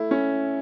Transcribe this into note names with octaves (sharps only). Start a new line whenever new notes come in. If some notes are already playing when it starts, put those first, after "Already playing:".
Already playing: A3 E4
C#4